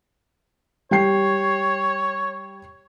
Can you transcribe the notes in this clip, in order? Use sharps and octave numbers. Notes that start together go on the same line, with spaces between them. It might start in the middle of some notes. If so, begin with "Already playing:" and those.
G3 C#5 G5 C7